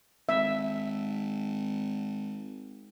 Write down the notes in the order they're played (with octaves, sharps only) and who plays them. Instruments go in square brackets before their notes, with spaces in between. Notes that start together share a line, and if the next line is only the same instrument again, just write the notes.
[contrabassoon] G#1 [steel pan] E5